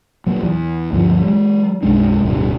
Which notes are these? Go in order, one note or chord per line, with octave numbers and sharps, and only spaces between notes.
A#2 F#3
E2
D2 G2 F3
F#3 G#3
B1 F#2 G#3 D4
D1 G2 B2 G3